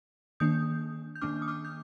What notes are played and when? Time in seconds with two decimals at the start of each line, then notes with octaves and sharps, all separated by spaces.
0.40 D#3 A#3 D4 D#6 G6
1.15 G6
1.21 D#3 A#3 D4 D6 F6
1.42 D#6
1.48 D6 F6
1.65 G6